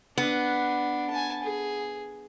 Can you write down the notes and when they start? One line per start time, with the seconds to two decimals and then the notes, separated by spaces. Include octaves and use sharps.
0.18 B3 D4
1.10 G#5 A5
1.43 G#4